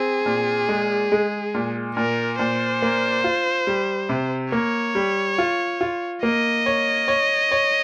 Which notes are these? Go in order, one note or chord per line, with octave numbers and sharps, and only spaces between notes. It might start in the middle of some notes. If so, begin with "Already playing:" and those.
Already playing: C4 G#4
A#2
G#3
G#3
A#2
A#2 A#4
A#2 C5
A#3
F4
G3
C3
A#3 C#5
G3
F4
F4
A#3 D#5
C#5
C#5
C#5